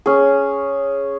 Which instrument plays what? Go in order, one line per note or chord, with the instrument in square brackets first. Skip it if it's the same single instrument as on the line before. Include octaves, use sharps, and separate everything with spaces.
[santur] C#4 G#4